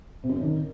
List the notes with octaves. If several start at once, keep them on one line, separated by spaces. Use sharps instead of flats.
C3
F#2
C#3
D#3